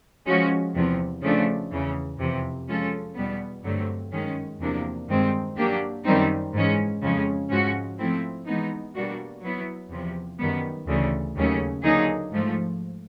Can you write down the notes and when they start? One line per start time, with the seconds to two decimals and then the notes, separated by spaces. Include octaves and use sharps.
0.25 F3 G#3 C#4 F#4
0.74 E2 C3 F3
1.22 C#3 F3 A3 D4
1.70 E2 C#3 E3
2.19 F2 C3 E3
2.67 F3 G#3 C#4 F4 A4
3.15 E2 B2 G3 B3
3.63 G2 D3 F#3 A3 C4
4.11 F#2 D#3 G#3 C#4
4.60 E2 C3 F3 A#3 D4
5.08 G2 D#3 G#3 C4
5.56 F#3 A#3 D4 G4
6.05 F#2 D#3 G3 C4 D#4
6.53 G#2 E3 G#3 C#4
7.01 F2 C#3 F3 G#3 C#4
7.49 G#2 F3 G#3 C#4 F#4
7.98 F3 A3 C4 E4
8.46 E3 G#3 B3 D#4
8.94 B2 G3 A#3 D4 F#4
9.42 F#3 B3 E4
9.90 E2 C3 F3
10.39 F#2 D#3 G3 B3
10.86 D2 C#3 E3 A3
11.35 D#2 C#3 F#3 A3 C#4
11.83 D3 F#3 A#3 D#4 G#4
12.32 G#2 F3 A3